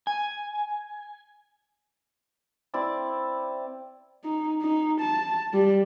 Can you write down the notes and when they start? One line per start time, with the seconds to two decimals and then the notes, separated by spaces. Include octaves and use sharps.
0.07 G#5
2.74 C4 E4 D5 A5
4.24 D#4
4.62 D#4
5.00 A5
5.53 G3